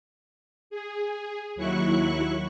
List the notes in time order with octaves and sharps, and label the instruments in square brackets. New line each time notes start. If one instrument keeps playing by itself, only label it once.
[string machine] G#4
D#2 F#3 E4 C#6 F#6